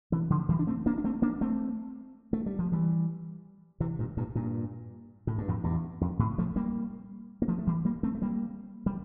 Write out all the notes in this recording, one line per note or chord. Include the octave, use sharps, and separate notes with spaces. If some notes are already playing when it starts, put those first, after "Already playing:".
C3 E3
D3 F3
E3 G3
D4
A3 C4
A#3 D4
D4
A3 C4
A#3 D4
A3 C4
A3
G3
F3
E3 G3
C3 E3
G2 A#2
G2 A#2
G2 A#2
A2
G2
F2 A2
E2 G2
F2
A2 C3
F3 A3
G3 A#3
A#3
F3 A3
A3
E3 G3
G3 A#3
A3 C4
A3
G3 A#3
G3